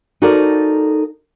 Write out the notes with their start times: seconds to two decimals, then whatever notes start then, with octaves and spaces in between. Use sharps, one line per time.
0.22 D#4 F#4 A4 A#4 C5 D5